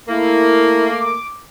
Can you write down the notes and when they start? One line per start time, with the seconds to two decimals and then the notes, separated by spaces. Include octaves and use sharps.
0.08 A3 A#3 E4
0.92 D6